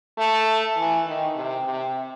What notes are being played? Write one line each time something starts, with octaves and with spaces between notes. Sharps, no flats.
A3
E3
D#3
C3
C3